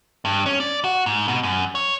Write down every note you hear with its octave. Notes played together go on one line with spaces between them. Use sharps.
G2
C#4
D5
F#4
G#2
B2
F#2
C#5